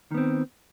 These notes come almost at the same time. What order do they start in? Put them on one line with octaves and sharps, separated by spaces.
D#3 B3 C4